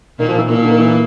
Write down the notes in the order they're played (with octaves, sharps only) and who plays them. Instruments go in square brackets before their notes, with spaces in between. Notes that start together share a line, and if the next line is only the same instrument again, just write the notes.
[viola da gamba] A#2 A#3 [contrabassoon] D#3
[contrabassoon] F3
E3
[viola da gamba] A#2 A#3 [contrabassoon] D#3
[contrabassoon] D3
D#3
E3